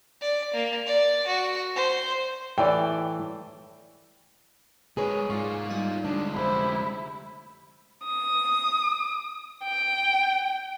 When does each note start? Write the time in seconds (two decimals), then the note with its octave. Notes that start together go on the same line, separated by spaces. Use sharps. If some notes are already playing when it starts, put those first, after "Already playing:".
0.21 D5
0.54 A#3
0.87 D5
1.27 F#4
1.76 C5
2.58 A2 E3 D5 G5
4.97 G#3 G#4 A#4 B4 C#5
5.30 G#2 F4 D5 C#6
5.69 G3 D#4 D#5
6.05 D2 G#3 D4
6.34 F2 C3 E4 C5
8.04 D#6
9.63 G5